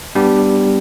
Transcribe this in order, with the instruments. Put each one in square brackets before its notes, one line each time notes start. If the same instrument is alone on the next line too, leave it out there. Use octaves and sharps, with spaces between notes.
[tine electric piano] G3 B3 D4 G4